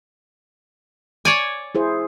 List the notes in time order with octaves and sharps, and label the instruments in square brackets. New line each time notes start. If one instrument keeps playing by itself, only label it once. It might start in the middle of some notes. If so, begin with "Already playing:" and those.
[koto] C#5 D5 G#5
[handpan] E4 G#4 C5